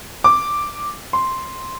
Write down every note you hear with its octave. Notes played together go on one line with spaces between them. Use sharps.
D6
C6